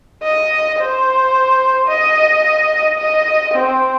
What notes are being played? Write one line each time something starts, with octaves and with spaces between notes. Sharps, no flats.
D#5
C5
D#5
D#5
C4